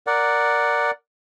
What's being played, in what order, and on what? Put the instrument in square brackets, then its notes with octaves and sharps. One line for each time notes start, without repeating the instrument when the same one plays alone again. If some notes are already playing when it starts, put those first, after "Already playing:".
[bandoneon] A#4 D5 F#5